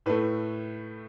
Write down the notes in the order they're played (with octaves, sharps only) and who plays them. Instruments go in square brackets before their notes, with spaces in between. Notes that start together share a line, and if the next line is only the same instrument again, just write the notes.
[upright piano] A2 A3 B4